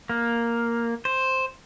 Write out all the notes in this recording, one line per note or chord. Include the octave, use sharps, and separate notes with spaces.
A#3
C5